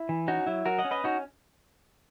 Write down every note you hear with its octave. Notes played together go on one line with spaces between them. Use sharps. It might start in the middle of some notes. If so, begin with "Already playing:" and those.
Already playing: E4
E3
C#4 D#4 F#4
F#3 E4
F#3 F#4 A#4
D#5 F#5
C#4
B4 D#5
C#4 D#4 F#4